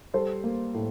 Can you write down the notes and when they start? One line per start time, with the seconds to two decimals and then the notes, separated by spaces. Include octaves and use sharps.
0.14 G3 A4 C5
0.44 A#3
0.74 A2